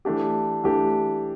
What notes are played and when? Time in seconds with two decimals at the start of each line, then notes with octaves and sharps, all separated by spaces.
0.05 E3 A3 D4 G4
0.64 E3 A3 D4 G4